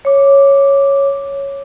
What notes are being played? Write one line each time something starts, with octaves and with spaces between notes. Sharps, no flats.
C#5 D6